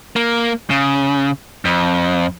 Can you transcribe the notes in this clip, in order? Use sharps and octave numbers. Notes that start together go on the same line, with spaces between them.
A#3
C#3
F2